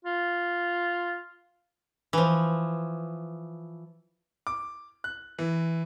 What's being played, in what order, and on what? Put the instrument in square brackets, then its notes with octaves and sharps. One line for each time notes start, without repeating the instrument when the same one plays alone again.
[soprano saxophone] F4
[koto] E3 F3
[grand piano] D6
F#6
E3